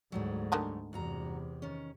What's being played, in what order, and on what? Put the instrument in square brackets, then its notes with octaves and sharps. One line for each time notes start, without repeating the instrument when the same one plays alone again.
[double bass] D2 G#2 [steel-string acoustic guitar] F#3 G3 A3
[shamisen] D3 D#3 G#3
[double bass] E2 C3 [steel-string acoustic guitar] G2 F#4 A#5
[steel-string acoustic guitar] D#3 C#4